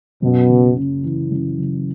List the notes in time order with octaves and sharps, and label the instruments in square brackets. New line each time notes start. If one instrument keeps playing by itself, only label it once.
[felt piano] F#2 [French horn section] B2
[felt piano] F#1
C#3
E3
F#2
F#1